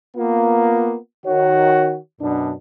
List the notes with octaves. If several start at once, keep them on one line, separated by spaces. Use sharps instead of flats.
A#3 B3 F4
D#3 F#4 C#5
F#2 B2 D4